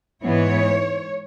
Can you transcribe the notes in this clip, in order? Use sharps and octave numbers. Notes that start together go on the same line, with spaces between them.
G#2 E3 B3 C#5